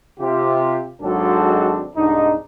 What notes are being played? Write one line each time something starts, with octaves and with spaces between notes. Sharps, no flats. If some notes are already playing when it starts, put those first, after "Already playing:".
C3 F4 G4
G#1 F#3 G#3 C4 D4 A4
C2 G#2 D4 D#4